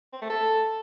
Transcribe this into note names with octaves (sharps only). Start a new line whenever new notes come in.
C4
A3
A4